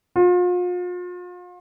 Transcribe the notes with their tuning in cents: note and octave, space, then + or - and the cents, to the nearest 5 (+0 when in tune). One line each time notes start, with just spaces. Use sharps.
F4 +40